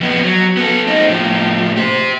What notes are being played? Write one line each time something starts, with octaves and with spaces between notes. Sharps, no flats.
F2 B3
F#3
B3 A4
C4 D#4
A2 F3
G4 C5